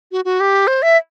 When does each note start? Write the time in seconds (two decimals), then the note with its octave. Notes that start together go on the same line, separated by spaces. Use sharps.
0.12 F#4
0.25 F#4
0.40 G4
0.67 C5
0.82 E5